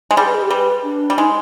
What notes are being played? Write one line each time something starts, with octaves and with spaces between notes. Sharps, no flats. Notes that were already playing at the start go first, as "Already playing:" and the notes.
G#3
G3 G#4
B4
G#4
G4
G3 B4
D4
G3
G#3 D#4